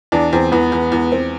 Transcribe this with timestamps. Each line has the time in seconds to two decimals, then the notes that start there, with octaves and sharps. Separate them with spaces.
0.12 E2 D4
0.32 E2 C4
0.52 E2 B3
0.72 E2
0.92 E2
1.12 C4